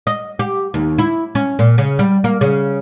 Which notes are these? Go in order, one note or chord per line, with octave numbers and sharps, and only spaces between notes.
D#5
G4
D#2
E4
C#4
A#2
C#3
G3
A#3
C#3